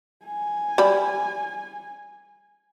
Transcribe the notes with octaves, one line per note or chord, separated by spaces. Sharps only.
G#5
G3 B5